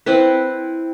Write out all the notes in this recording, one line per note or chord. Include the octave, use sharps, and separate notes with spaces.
C4 E4 B4